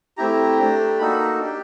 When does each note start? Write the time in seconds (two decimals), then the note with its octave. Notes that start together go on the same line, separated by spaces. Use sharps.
0.17 A3 C4 E4 G4 A#5
0.58 A3 D4 G4
0.99 A#3 D#4 F#4 A4 B5
1.20 A#5
1.40 D4 G4